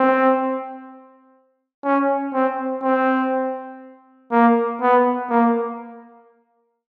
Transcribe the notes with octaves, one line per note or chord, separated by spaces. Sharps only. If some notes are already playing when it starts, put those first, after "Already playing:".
Already playing: C4
C#4
C4
C4
A#3
B3
A#3